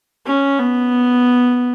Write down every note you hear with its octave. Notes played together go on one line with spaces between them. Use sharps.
C#4
B3